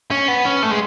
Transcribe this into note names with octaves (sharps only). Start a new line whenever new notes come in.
C#4
B3
C#4
A3
G#3